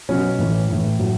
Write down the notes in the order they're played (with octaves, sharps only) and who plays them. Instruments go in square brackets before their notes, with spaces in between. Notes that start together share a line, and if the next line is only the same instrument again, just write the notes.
[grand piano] B2 F#3 C#4
A2 E3
A2 E3
A2 F#3